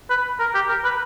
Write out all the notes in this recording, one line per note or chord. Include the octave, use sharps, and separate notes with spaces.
B4
A#4
G4
A#4
B4